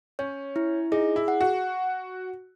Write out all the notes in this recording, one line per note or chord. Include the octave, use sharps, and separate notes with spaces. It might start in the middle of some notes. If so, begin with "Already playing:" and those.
C#4 C#5
E4
D#4 G#4
E4
F#5
F#4